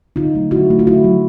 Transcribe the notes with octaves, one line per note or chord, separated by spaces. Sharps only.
D3 D#4 F4
F#3 A3
D3 E4 F#4
F#3 A3
F4
D3 E4 F#4
F#3 A3